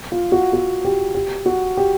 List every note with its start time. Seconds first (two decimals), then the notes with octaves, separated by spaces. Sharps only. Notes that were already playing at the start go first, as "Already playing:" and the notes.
0.12 F4
0.32 F#4
0.53 F#4
0.85 G4
1.15 G4
1.46 F#4
1.77 G4